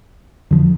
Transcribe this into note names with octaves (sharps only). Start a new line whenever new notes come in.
F2 D3 F3